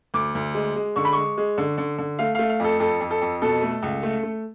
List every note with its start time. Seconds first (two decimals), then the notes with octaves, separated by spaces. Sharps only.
0.14 D2 D6
0.35 D2
0.54 G#3
0.76 G#3
0.96 D3 C#6
1.05 B5
1.13 G#3 C#6
1.37 G#3
1.58 D3
1.78 D3
1.98 D3
2.19 A3 F5
2.35 A3 F5
2.50 F5
2.60 F2 A4
2.80 F2 A4
3.01 F2
3.11 A4
3.21 F2
3.42 B2 A4
3.62 A3
3.83 C#2
4.03 A3
4.23 A3